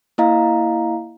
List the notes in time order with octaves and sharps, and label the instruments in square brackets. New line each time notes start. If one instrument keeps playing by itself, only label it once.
[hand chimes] A#3 E4 D#5 F5 A#5